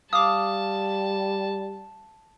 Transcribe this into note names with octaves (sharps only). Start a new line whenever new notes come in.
G3 F5 A5 D6 D#6